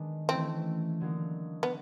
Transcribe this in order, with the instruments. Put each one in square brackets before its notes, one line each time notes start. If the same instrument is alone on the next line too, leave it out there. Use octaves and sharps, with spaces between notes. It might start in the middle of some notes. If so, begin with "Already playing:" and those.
Already playing: [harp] D#3 G#3 B3 D4
[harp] E3 A3 C#4 E4 [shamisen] C4
[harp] D3 F#3 A#3 D#4
[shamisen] B3